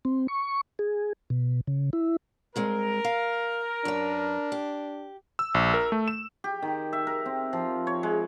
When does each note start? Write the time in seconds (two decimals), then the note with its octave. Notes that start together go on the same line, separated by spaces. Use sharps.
0.05 C4
0.28 C#6
0.79 G#4
1.30 B2
1.67 C#3
1.93 E4
2.56 G2 G#3 C4 A#4
3.04 F5
3.85 F#2 D4 B4
4.52 G4
5.39 E6
5.54 A#1
5.74 A#4
5.92 A3
6.08 E7
6.44 G4
6.62 D#3
6.93 E5
7.07 A#4
7.26 C4
7.53 F3
7.87 C#5
8.03 G#3